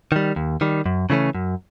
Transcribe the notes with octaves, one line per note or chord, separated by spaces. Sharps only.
D#3 G3
D#2
D#3 G3
F#2
C#3 E3 A3 C#4
F#2